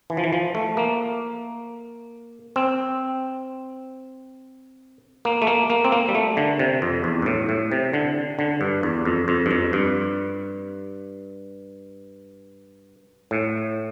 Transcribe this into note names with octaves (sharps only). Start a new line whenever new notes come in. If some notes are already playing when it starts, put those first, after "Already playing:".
E3
F3
E3
F3
A3
A#3
C4
A#3
A3
A#3
A#3
C4
A#3
G3
A3
D3
C3
F2
E2
G2
A2
A2
C3
D3
D3
G2
E2
F2
F2
G2
F2
G2
A2